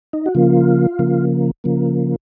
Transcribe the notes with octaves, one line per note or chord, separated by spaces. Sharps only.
D#4
F#4
C#3 F3 A#3 F4
C#3 F3 A#3
C#3 F3 A#3